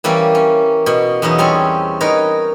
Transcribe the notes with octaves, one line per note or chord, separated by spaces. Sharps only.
E3 G3 A#3 C#4
C#4
B2
E2 B2 F#3 D#4
G3 C4 C#4 C#5
D#4 A#4 B4 C#5